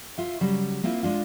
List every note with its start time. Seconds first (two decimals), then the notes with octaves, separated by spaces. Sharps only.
0.18 F4 E5
0.41 C#3 F#3 G3
0.83 A#3 C4 E4 F4
1.03 G#3 D4 F4